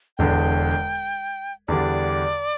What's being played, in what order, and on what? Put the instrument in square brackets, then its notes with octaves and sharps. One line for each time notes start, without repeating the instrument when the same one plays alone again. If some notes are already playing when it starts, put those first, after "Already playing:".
[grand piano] E1 E2 D3 [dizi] G5
[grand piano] E2 D3 G3 D4 [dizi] D5